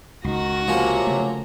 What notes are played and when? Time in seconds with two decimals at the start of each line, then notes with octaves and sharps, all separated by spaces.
0.24 C#2 D#3 F#4 A#6
0.68 C3 F3 F#3 A#3 C#4
1.07 C#3 A3